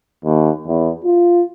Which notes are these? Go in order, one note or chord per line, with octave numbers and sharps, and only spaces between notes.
D#2
E2
F4